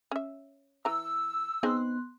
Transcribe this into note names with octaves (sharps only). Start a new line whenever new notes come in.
C#4 E5
E3 A#5 E6
B3 C4 D#4 G#4 C6 F#6